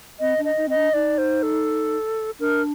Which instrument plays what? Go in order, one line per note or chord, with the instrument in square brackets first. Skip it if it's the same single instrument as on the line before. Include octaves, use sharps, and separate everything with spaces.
[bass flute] C4 [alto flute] D#5
[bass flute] D4
[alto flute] D#5
[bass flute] D#4
[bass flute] C4 [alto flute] D#5
[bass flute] D4
[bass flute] D#4 [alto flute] D5
[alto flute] C5
A4
[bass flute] D4 [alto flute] A#4